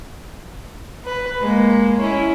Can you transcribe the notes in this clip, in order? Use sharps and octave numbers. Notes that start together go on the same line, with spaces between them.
B4
G#3 A#3
C#4 E4